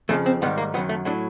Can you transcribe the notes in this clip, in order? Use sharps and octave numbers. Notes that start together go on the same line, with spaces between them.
F2 C#3 F3 A3
C4
G#2 D#3 G3 B3
A#3
F#2 D#3 F#3 B3
A3
A2 F#3 D4